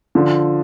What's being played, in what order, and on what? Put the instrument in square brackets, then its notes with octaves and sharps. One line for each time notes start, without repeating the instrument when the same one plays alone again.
[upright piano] D3 F3